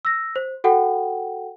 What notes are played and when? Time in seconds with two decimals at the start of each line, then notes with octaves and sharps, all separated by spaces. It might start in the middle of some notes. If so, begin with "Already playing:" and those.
0.05 E6 A#6
0.36 C5
0.64 F#4 A4 F#5 G5